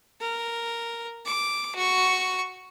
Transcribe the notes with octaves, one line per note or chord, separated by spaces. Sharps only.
A#4
D6
F#4 C#6